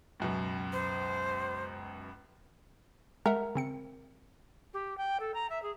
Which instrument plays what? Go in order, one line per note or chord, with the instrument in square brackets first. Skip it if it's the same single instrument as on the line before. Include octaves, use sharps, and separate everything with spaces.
[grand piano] C#2 F#2 B2
[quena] C5
[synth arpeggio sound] G#3 E5 F#5 [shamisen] A#4
[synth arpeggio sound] C#3 C4 C#7
[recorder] G4
G5
A4
A#5
E5
G#4